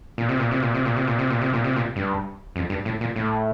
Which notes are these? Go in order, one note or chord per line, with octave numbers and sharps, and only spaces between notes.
A#2
C3
A#2
C3
A#2
C3
A#2
C3
A#2
C3
A#2
C3
A#2
C3
A#2
G2
F2
G2
A2
A#2
A2